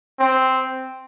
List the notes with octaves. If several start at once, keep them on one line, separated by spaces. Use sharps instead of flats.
C4